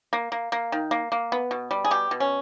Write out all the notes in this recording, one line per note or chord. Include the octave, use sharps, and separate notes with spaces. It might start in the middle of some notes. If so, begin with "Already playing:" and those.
A#3
A#3
A#3
D#3
A#3
A#3
B3
B2
G3
G#4
B2 G4
B2
C#4